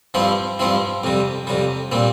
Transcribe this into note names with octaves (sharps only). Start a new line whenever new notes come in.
G2 F3 C4 E4
G2 F3 C4 E4
F2 C3 G3
F2 C3 G3
A#2 G3 C4